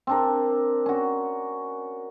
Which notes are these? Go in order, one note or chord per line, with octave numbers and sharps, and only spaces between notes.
C4 D4 A#4
C#4 F#4